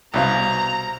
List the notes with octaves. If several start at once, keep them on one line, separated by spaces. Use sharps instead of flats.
C2 B2 F5 A#5